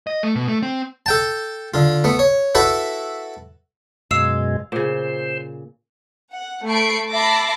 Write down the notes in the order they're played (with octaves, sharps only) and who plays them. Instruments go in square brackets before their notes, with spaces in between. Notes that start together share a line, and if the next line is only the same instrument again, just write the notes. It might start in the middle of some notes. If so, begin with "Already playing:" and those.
[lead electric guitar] D#5
A3
B2
A3
C4
[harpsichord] A4 G5 A5
D3 F4
A3 B3
C#5
E4 F#4 A4 B4 E5
[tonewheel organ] F#2 B2 G#3 [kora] F5 [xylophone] E6 C7 E7
[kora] A#2 C#3 [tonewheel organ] C5
[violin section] F#5
A3 A5 B5 C#6 C7 D7
E5 A5 B5 D6 A#6 C7